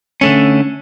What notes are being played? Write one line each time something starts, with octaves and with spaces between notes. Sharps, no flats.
D3 A3 C#4